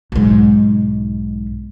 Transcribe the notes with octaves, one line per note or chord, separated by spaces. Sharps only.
B1 G#2